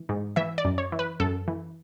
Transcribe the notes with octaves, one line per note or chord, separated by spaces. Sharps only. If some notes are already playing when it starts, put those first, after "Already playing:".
Already playing: E3
G#2
E3 E5
D5
F#2
C#5
E3
B4
F#2 A4
E3